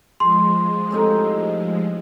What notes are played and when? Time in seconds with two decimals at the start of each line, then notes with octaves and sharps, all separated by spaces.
0.20 F3 G#3 G#4 C6
0.91 A2 C3 D#4